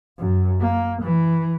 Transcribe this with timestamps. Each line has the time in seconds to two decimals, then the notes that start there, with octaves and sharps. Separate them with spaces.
0.18 F#2
0.60 A#3
1.02 E3